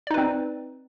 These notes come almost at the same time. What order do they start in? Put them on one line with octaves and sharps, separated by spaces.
D5 D#4 B4 C4